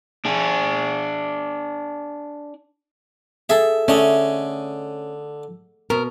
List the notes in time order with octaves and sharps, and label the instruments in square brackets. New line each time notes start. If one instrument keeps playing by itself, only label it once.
[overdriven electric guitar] D4 G#4
[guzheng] G#4 A4 [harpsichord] E5
[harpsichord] D3 D#5 [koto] A3 [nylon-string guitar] C#4
[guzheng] B2 [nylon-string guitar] A#4